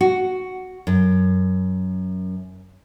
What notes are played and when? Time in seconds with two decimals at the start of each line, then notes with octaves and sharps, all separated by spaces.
0.01 F#4
0.87 F#2